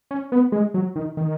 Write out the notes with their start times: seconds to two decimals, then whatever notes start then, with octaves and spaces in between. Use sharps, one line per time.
0.11 C#4
0.32 B3
0.52 G#3
0.74 F#3
0.96 D#3
1.17 D#3